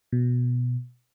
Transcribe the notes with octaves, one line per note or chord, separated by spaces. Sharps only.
B2